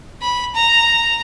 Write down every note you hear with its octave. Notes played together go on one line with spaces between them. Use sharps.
B5
A#5